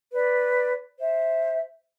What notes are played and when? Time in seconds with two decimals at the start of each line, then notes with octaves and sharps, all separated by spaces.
0.13 B4 D5
0.99 C5 E5